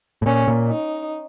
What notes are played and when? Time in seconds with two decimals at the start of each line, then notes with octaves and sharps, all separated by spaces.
0.22 A2
0.26 A#2 C#4
0.48 A#2
0.69 D#4